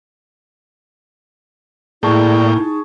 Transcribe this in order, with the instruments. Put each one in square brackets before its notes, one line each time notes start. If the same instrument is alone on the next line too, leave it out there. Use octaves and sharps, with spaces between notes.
[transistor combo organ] A2 A#3 G5 [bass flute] E4 [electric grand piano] G#4 A5 C#6 [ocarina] D5
[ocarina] D#4